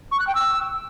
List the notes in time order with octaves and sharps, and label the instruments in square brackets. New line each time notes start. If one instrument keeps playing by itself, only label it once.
[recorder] C#6
F#6
G5
E6